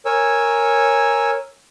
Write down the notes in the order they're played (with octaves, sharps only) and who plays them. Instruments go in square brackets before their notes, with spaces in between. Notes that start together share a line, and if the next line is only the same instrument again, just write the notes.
[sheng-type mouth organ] A#4 C#5 G#5 E6